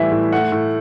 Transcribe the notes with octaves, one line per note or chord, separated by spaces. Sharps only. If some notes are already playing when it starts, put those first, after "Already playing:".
Already playing: A2 E3 G3 E5
A2
A3 F#5
A2